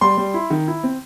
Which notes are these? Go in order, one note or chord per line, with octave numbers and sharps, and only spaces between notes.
G3 C6
G3
E4
D#3
E4
C4